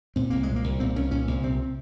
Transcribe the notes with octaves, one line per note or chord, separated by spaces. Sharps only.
A#2 C4
C2 A#3
G#3
A#2
A#3
C2
A#2 C4
C2 C#4
A#2 C#4
C2 A#3
C3 C4